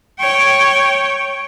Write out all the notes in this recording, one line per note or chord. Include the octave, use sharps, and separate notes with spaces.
C#5 G5